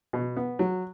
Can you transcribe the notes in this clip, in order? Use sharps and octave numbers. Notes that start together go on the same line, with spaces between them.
B2
B3
F#3